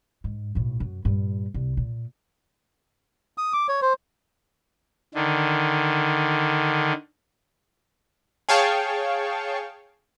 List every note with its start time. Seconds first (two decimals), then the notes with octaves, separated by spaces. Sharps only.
0.24 G#2
0.55 B1 A2
0.80 F#2
1.05 G2 A#2
1.54 C2
1.77 A#2
3.38 D#6
3.53 D6
3.69 C#5
3.82 C5
5.15 D3 D#3
8.49 G#4 C#5 F5 G5 A5 C#6